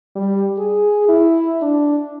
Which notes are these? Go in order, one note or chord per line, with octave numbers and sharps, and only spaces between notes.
G3
G#4
E4
D4